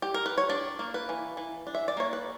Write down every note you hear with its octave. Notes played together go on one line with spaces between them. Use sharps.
G4
A#4
B4
C#5
D4 D5
A#3
B4
E3
E3
D4
E5
D5
A#3 C#5
B4